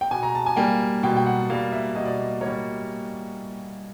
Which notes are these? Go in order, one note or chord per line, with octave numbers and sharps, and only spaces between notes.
G5
B2 G#5
A#5
A5
G#5
G3 A#3 G5
B2 G5
G5
F#5
G3 A#3 F5
E5
B2 D#5
D5
D#5
A#3 C#5
G3